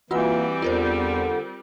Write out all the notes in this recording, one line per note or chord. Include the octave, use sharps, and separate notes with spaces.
E3 G3 A#3 C4 F4 F#4 F#5
E2 D3 F4 A#4 C5